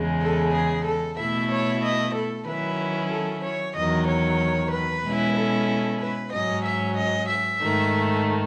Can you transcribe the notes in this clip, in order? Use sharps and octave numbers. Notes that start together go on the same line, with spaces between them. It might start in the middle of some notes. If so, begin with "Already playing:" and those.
Already playing: E2 C#3 G#3
A4
G#4
A4
B2 A3 E4 E5
C#5
D#5
A4
D#3 F#3 C#4 E4 B4
A4
C#5
E2 D#3 F#3 D#5
C#5
B4
B2 G#3 C#4 E4
A4
B4
G#2 F#3 C#4 D#5
E5
D#5
E5
G#2 D#3 A3